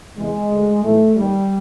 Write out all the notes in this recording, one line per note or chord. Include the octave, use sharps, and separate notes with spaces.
E2 C3 E3 G#3
D2 D3
B1 A2 E3 A3
D#2 D#3 G3